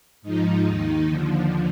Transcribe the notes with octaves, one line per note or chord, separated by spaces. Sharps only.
G#2 F3 D#4
D#2 D#3 D#4
D#2 D3 F3